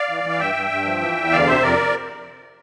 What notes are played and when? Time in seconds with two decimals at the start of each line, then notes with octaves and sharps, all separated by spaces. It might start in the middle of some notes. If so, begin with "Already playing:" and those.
Already playing: D5 F5
0.09 E3
0.23 E3
0.29 F5
0.39 G2 E5 G5
0.55 G2
0.71 G2
0.85 F3
1.01 E3
1.17 E2
1.31 D2 D5 F5
1.46 C3 C5 E5
1.62 F2 A#4 D5